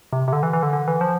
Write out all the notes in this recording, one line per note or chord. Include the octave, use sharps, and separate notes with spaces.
C3
C3
D3
E3
E3
D3
D3
E3
F3